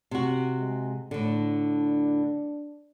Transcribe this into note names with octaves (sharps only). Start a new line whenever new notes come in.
C3 F#4
G#3
A2 D3 D4